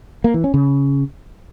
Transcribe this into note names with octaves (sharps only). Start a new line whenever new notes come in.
A#3
E3
C#4
C#3